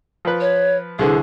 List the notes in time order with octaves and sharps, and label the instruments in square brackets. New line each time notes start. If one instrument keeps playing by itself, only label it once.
[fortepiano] F3 B4
[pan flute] C#5
[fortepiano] C2 D3 E3 [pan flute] G#4